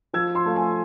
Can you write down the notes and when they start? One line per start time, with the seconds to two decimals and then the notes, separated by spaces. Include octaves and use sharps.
0.13 F3 E6 G#6
0.35 C6 E6
0.46 A3 F5
0.56 G#5